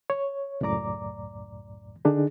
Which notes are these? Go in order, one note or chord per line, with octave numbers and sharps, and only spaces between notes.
C#5
C#2 F#2 A2 D5 A#5 D6
D3 D4 D#4 G#4